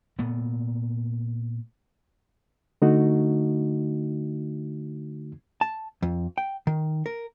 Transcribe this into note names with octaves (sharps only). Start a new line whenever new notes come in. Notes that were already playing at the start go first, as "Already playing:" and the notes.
A#2 A3 B3
D3 A3 D#4 F#4
A5
F2
G5
D#3
A#4